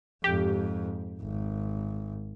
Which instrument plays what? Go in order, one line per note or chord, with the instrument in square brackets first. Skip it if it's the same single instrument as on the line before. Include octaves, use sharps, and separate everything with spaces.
[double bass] F2 G#2 [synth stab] G4
[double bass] G#1